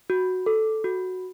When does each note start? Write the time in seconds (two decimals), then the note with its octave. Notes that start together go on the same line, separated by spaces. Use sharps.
0.10 F#4
0.46 A4
0.84 F#4